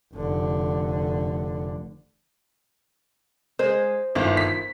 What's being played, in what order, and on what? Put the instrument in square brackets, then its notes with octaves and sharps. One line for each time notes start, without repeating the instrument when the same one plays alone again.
[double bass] F1 D3
[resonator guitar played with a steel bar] G#3 [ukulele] C5
[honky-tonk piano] G1 [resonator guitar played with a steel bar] D#3 E4 F4
[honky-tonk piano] B6